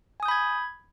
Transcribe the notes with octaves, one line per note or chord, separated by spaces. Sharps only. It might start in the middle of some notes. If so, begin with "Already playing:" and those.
G#5 B5 D#6 G6 G#6